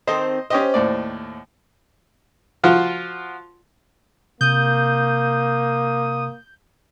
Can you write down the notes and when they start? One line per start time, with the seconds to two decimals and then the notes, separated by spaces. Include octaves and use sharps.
0.07 D#3 C4 A4 C5 D#5
0.50 C#4 G4 C5 D#5
0.74 D#2 A2 D5
2.64 F3 F4 F#4
4.41 C3 A#3 D#6 G6